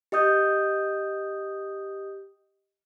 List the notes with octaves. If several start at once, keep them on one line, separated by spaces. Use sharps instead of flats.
G4 D#5 D#6 G6